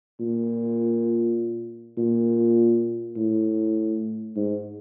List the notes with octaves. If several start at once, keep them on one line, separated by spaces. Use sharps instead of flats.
A#2
A#2
A2
G#2